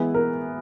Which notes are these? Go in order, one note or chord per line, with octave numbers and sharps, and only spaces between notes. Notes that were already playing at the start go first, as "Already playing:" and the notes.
Already playing: E3 G#3 B3 E4 B4
A#4